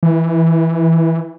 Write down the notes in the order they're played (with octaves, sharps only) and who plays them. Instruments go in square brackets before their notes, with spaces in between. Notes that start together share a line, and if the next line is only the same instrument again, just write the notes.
[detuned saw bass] E3